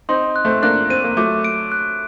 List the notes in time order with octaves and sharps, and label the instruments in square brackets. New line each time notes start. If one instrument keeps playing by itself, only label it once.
[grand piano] C4 D#4 [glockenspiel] C6
[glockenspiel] F#6
[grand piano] A3 C4
[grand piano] A#3 D4 [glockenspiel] F#6
[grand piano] C4 [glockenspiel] D#7
[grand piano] A#3
[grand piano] F#3 A3 [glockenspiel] D6
[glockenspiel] D7
F#6